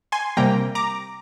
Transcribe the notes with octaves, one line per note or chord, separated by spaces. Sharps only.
G#5 C6
C3 G3 A#3 G5 A#5
A#5 D6